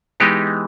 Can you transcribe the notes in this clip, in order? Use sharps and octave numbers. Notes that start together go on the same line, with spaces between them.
E3 G#3 B3 D#4 G4